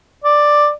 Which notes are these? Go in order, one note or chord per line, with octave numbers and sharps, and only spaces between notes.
D5